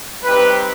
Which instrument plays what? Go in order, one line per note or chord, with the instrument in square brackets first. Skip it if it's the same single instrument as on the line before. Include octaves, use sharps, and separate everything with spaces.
[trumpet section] G3 C4 D#4 G4 B4